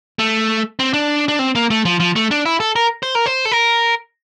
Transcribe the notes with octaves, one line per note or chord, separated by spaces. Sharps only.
A3
C4
D4
D4
C4
A#3
A3
F3
F3
A3
D4
E4
A4
A#4
C5
A#4
C5
A4
A#4